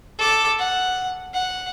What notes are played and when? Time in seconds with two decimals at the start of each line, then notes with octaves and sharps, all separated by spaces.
0.19 A4 D6
0.59 F#5
1.34 F#5